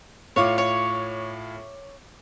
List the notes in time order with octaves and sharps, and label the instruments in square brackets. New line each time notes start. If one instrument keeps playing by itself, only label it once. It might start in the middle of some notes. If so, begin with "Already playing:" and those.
[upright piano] A2 F4 D6 [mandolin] C#5
[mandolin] C#5